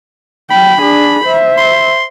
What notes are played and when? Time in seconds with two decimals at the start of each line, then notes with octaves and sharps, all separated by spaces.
0.51 F#3 G5 B5
0.80 D4 G#4
1.25 C5 E5
1.57 C6